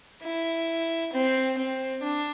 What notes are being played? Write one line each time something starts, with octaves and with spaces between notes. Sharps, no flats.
E4
C4
C4
D4